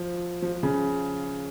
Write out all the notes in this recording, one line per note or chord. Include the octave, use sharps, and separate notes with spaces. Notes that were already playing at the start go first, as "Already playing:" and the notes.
Already playing: F3
F3
C#3